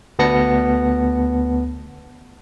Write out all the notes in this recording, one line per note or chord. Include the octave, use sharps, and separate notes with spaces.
D2 B3 A5 A#6 C#7